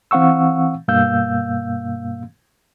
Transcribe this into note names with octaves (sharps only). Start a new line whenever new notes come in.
E3 C4 F5 F#5 C#6 E6
G2 B2 A#3 F5 E6 G6